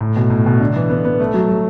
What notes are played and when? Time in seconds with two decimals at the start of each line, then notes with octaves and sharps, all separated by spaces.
0.01 A2
0.17 B2
0.30 A2
0.46 B2
0.60 D3
0.76 E3
0.90 B3
1.05 B3
1.20 A3
1.34 F#3
1.49 F#3